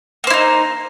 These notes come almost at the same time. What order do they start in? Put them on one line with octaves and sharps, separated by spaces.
A#3 C5 E4 D#4